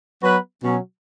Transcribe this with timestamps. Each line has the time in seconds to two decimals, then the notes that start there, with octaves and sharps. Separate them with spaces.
0.22 F#3 B3 F#4 B4
0.63 B2 F#3 C#4